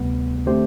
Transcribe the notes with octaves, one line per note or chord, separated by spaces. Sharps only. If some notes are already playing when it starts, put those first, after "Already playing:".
Already playing: D2 C3 G3 B3
D3 A3 C4 G4 C5